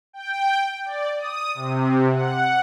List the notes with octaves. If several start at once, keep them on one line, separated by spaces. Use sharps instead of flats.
G5
D5
D#6
C3
F#5